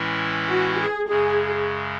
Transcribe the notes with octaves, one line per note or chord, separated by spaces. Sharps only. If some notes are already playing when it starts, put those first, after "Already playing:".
Already playing: A2 E3 G#3 C#4 E4
F#4
G#4
F#2 C#3 G#3 G#4